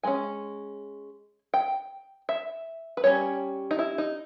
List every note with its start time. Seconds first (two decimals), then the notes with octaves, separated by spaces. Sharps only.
0.03 G#3 C#4 G#5
1.54 G5
2.29 E5
2.97 B4
3.04 G3 C#4 C#5
3.71 D#4
3.79 E4
3.98 D#4